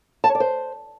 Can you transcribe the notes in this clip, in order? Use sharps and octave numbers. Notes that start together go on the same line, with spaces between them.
A5
C#5
D5
C5